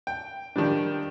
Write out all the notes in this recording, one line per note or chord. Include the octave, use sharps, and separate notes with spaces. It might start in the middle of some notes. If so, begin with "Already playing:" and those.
G5
D#3 F3 G3 D4